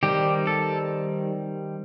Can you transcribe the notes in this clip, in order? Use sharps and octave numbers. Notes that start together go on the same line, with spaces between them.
D#3 G3 C4 G4
A4